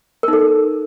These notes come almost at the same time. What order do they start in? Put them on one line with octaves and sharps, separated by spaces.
A#4 D#4 A4